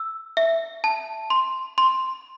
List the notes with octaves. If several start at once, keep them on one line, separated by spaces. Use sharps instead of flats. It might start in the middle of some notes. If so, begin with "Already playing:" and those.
Already playing: E6
E5
A5
C6
C6